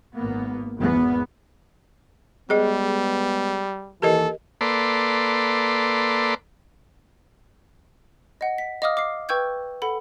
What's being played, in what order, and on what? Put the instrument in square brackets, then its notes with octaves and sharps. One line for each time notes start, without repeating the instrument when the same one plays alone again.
[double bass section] G#1 A#3 B3
G#1 E2 B3
[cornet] G3 [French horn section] G#3 B3 [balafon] G#4 D#5
[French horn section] D#2 E3 [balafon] G4 A#4 D#5 [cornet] A4
[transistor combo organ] A#3 A4 B4 D5 C6
[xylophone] D#5 F#5
B6
D#5 F5 D6 D#6 F6
D6 F6 C7
B4 G5 C#6 E6 G6 G#6
A4 F#5 B5